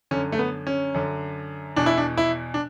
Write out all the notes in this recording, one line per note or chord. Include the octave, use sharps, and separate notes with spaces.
F#2 D3 C#4
A3
B3
C#4
F#2 D3
E2 B2 D4
E4
D4
E4
D4